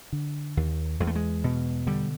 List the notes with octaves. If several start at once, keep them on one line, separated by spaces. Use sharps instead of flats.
D3
D#2
E2 G#3
A3
G#3
B2
D3 G3